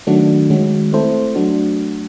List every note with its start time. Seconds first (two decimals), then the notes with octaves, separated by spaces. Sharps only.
0.07 D#3 F#3 A3 D4 F#4
0.50 D#3 G#3 C#4 F#4
0.93 A3 C4 E4 A4 C5
1.35 F#3 A3 D4 F#4